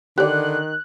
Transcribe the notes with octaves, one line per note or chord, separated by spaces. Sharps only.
D3 D#3 G4 D5 F#6